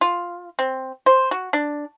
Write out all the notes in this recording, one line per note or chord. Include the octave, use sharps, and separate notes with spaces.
F4
C4
C5
F#4
D4